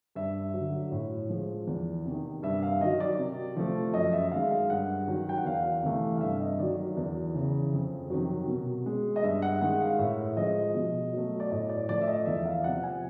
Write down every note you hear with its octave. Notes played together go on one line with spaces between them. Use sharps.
G2 E5
D3 F#3
A2
F3 G#3
E2
C3 D#3
G2 E5
F5
D#3 F#3 D#5
D5
C3
F3 A3
F#2 D#5
E5
D#3 G#3 F5
F5
G2 F#5
D#3 F#3
G5
F#5
E2 F5
C3 E3 A3
F5
G2 E5
D#5
D#3 F#3 D5
E2
C#3 E3
F2
C3 D#3 F#3
B2
G#3
D#5
G2 E5
F#5
D#3 G#3 F#5
F5
A2 E5
F3 G#3 D#5
B2
F#3 A3
D5
A2 D#5
D5
F3 A3 D5
E5
D#5
E2 E5
E5
F5
C3 F3 F#5
G#5